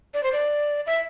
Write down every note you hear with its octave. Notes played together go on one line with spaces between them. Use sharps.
D5
C5
D5
E5